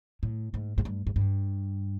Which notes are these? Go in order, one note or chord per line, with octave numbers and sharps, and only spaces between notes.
A2
G#2
G#2
G2
G#2
G2